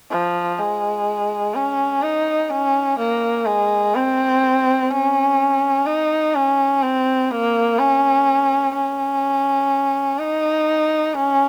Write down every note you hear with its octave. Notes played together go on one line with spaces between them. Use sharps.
F3
G#3
C#4
D#4
C#4
A#3
G#3
C4
C#4
D#4
C#4
C4
A#3
C#4
C#4
D#4
C#4